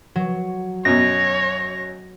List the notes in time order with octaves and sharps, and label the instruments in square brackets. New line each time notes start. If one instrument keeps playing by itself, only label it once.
[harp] F#3
[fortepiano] F#2 B2 [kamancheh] C#5 [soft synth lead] A#6